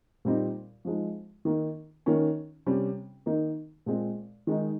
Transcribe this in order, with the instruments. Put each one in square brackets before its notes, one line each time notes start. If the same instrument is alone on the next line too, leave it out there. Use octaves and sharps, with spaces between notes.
[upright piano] A#2 G3 C4 D#4
F3 G#3 D#4
D#3 A#3 D#4
D#3 A#3 C#4
C3 G3 C#4
D#3 A#3 D#4
A#2 G#3 C4
D#3 G#3 D#4